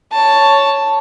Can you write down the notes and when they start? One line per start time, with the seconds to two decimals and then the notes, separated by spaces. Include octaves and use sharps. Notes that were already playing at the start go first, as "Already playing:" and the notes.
0.12 C#5 A5